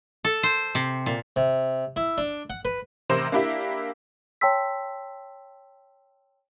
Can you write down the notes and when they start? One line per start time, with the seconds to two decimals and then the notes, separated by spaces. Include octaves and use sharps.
0.25 A4
0.43 C5
0.75 C3
1.06 A#2
1.36 C3
1.96 E4
2.18 D4
2.50 F#5
2.65 B4
3.10 A1 C3 A#4 C5 C6 E7
3.32 A#3 D4 E4 G4 E5
4.41 C#5 G5 A5 C6 E6 B6